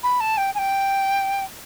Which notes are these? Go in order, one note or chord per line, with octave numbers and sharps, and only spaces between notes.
B5
A5
G5
G#5
G5